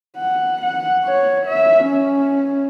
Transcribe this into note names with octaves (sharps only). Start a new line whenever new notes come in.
F#5
F#5
C#5
E5
C#4